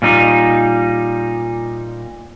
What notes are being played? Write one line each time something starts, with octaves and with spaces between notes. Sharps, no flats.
A#2 G3 D#4